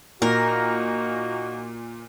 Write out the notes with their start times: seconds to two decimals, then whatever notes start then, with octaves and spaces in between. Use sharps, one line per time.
0.22 A#2 A#3 D#4 F#4 A#4